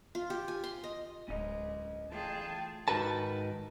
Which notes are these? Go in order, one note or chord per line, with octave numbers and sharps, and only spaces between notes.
F4
G4
G#5
C6
D#5
D1 G#3 C#4 D#5
E3 A3 F4 G#4 G5 A5
G#2 D#3 F#4 A#4 B4 A5